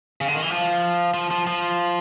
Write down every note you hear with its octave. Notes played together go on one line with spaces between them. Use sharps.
C#3
D3
D#3
E3
F3
F3
F3
F3